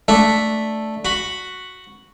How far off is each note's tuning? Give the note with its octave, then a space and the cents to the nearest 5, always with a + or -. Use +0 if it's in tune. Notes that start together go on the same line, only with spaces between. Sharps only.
A3 +0 D4 +0 E5 +0
F#4 +0 B5 +0